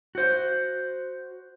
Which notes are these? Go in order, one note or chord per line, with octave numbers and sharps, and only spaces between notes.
F#4 C5